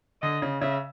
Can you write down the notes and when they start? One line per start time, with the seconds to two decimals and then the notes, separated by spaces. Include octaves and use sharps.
0.22 D3 D#5
0.42 C#3
0.61 C#3 E5